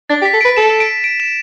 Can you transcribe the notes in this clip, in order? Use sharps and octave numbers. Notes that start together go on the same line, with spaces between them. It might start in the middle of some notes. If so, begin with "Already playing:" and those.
D4 A6
G4
B6
A4
B4 D7
A4 E7
D7
D7
E7